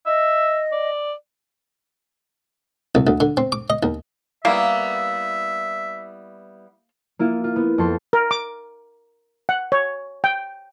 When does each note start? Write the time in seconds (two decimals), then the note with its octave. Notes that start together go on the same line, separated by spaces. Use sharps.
0.06 D#5 E5
0.72 D5
2.95 C2
3.07 D2
3.20 D3
3.37 C4
3.52 D6
3.70 D#5
3.83 D#2
4.45 G3 A#3 B3 E4 A#4 E5 F5 A#5
7.19 A#3 E4 F4
7.44 F4
7.56 B3
7.78 F2 A4 C6
8.13 A#4
8.31 D6
9.49 F#5
9.72 C#5
10.24 G5